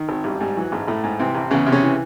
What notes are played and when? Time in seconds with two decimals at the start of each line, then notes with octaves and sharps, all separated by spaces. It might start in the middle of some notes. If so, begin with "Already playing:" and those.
Already playing: D#3
0.09 G#1
0.24 A1 G3
0.40 G#2 G3
0.57 E3 F#3
0.72 A1 G#2 G#3
0.88 A1 A2 A3
1.03 G#2
1.19 C3 E3 C4
1.35 A1
1.51 E2 C#3 C#4
1.67 C3
1.72 C#3 C#4
1.83 E3